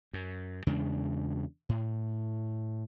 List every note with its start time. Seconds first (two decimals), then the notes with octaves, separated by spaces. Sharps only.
0.13 F#2
0.67 E2 C#3 G#3 D4
1.69 A2